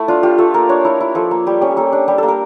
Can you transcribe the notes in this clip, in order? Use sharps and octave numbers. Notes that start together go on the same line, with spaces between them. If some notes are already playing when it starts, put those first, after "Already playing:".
Already playing: A3 E4
D4 F4
F4 G4
A3 A4
A#3 A#4
D4 C#5
E4 A#4
E4
F3 A4
A#3
G3 G4
C#4 G4
A#3 A4
D4
G3 G4
A#3 A4
A#4